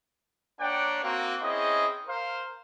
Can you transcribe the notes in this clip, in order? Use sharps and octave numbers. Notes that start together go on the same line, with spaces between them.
A#3 D4 C#5 D5 F#5 G5
A#3 C4 F#4
C4 C#4 E4 G#4 D#5
A#4 C5 F5